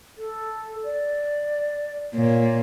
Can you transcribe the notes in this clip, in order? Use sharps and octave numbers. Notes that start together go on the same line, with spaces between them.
A4
D5
A#2 C#5